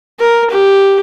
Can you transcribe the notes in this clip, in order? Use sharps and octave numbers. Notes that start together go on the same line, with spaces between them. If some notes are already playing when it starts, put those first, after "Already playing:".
A#4
G4